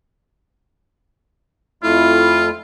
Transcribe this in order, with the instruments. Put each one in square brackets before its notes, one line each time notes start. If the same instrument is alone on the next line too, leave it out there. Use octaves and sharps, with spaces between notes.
[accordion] F2 A3 E4 [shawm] F4